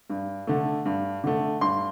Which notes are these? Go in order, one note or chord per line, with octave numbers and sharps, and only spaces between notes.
G2
D3 A3
G2
D3 A3
G2 C6